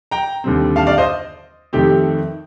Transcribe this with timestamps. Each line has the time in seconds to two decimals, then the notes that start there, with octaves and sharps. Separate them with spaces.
0.11 G5 A#5
0.44 D#2 D3 G3 C4
0.76 F5 A5
0.87 D5 F5
0.98 C5 D#5
1.73 F2 D#3 A3 C4 G4